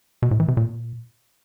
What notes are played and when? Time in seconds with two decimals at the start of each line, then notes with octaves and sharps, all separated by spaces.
0.22 B2
0.31 A2
0.40 E3
0.48 C3
0.57 A#2